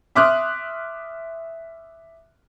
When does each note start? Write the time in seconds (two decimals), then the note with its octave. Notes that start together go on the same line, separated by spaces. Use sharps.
0.15 E5 C6 D6 D#6 F6 F#6